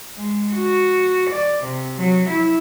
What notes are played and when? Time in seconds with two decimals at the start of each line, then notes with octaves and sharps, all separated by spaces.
0.16 G#3
0.53 F#4
1.30 D5
1.63 C3
1.98 F#3
2.29 E4